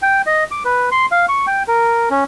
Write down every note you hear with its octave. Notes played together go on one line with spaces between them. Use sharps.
G5
D#5
D6
B4
C6
F5
C#6
G5
A#4
C#4